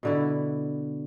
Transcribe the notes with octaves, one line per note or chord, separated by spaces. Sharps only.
B2 D3 E4